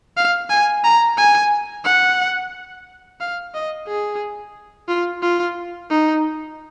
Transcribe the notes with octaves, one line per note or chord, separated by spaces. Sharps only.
F5
G#5
A#5
G#5
F#5
F5
D#5
G#4
F4
F4
D#4